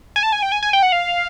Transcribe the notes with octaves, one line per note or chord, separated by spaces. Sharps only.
G#5
A5
G#5
G5
G#5
G#5
G5
F#5
F5